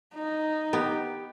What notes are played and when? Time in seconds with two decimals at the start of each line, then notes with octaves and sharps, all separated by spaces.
0.14 D#4
0.73 B3 G4